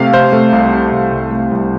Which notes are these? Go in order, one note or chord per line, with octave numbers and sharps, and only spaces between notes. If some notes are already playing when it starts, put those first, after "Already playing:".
Already playing: C3 A3 F5
C3 C5
A3
C2
C3
C2
C2
A3
C2